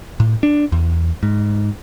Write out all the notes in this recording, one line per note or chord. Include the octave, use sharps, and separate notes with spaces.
A2
D4
E2
G#2